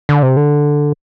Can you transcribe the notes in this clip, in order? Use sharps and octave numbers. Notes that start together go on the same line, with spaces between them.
D3
C3
D3